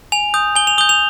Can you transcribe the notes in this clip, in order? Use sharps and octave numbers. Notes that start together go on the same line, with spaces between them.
G#5 F7
D#6 G6
G#5 G7
F7
D#6 G6 G7
F7